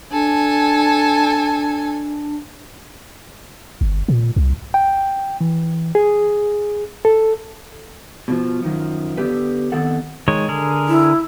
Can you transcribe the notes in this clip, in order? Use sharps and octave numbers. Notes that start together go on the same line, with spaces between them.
D4 A4 G#5
G1
A#2
C2
G5
E3
G#4
A4
B2 D#3 F3
F#2 D#3 F3
D3 B3 G4 B4
F2 D#3 B3 A4 F#5
D#3 G#3 C#5
D3 G#4 A#4
E4